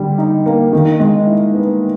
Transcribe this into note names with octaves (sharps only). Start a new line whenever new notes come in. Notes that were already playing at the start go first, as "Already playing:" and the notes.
Already playing: D3 G3
D#4
A#3
D#3
G#3
E4
B3